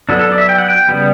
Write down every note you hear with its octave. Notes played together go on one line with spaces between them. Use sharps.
F#3 B3 D4 A4
A4
D5
E5
G5
F#5
G5
C#3 G3 B3